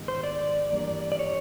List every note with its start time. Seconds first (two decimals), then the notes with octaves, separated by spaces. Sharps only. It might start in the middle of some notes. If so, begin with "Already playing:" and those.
Already playing: G#2 D#3 G3 B3
0.08 C5
0.23 D5
0.71 G2 E3 G3 A#3 D4
1.12 D5
1.19 C#5